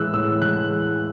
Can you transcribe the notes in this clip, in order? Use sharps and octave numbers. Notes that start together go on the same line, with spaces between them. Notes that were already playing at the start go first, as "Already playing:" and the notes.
Already playing: A2 E3 G#3 E6 F#6
A2 E6
E3 G#3 F#6